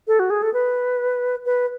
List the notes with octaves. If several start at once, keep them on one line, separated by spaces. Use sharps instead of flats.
A4
F#4
G#4
A4
B4
B4